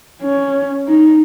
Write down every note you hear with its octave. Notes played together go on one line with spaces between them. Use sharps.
C#4
D#4